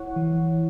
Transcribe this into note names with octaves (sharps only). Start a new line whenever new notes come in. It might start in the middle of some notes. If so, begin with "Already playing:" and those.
Already playing: E4 C#5 F#5
E3